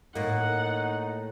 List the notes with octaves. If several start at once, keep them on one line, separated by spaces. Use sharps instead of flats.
A2 A#3 D#4 F#5